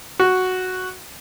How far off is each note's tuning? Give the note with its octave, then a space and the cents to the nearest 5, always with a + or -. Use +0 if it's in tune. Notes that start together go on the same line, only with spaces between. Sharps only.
F#4 +0